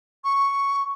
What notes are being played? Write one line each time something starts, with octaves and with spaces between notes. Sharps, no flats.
C#6